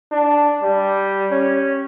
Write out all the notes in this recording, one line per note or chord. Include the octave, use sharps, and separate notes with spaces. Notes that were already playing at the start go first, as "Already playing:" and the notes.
D4
G3
C#4